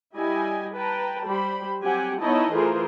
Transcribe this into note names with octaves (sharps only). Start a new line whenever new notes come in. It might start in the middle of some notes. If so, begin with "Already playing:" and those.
G3 E4 G4 D#5 G#5
B4 G5 A5 A#5
G3 G4 C5 B5
F#3 C4 G4 F#5 G#5
B3 D#4 E4 C#5 D#5 A5
E3 A3 F4 G#4 A#4 C5